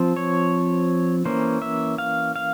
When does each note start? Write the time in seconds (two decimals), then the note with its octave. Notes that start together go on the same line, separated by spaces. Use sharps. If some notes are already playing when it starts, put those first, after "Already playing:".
Already playing: F3 C4
0.16 C#5
1.25 E3 A#3 C#4 C5
1.62 E5
1.98 F5
2.36 F5